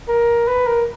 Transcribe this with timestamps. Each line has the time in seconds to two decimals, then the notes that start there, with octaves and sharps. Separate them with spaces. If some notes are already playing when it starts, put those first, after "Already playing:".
0.08 A#4
0.48 B4
0.67 A#4